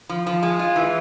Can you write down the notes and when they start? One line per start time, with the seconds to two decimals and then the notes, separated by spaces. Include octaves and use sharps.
0.09 F3
0.27 F3
0.43 G#3
0.59 F4
0.76 E3